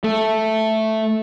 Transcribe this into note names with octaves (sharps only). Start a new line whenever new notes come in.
A3